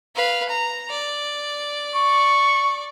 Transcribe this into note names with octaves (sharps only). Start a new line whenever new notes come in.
B4 F5
A#5
D5
C#6